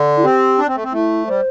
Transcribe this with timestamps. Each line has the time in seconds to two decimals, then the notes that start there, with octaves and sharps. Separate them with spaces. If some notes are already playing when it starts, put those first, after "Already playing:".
Already playing: D3
0.17 E4
0.24 C4 G4
0.59 D4
0.67 C4
0.75 A3
0.83 C4
0.92 A3 E4
1.27 G3 C5